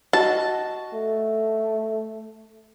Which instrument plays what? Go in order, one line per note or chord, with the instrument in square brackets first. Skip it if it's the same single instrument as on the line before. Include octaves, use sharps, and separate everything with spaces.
[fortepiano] F#4 D#5 [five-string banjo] A5
[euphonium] A3